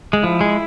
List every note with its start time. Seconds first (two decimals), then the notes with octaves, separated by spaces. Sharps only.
0.13 G#3
0.23 F3 E4
0.41 G#3